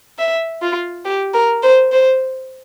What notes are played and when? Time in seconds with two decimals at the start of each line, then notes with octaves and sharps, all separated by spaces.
0.19 E5
0.62 F4
1.05 G4
1.34 A#4
1.63 C5
1.92 C5